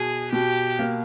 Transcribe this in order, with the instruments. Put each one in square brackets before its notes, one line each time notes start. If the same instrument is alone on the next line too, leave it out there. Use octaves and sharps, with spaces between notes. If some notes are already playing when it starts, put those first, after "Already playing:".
Already playing: [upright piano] B2 [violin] G#4
[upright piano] B2 [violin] G4
[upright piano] A#3